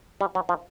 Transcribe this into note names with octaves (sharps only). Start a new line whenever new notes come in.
G3
F#3
F3